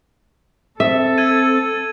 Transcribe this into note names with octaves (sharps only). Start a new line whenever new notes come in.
C4 A4 E5
E6 G#6 D#7